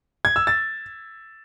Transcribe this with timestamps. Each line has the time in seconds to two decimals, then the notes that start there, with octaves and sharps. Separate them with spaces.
0.25 G#6
0.36 E6
0.47 A6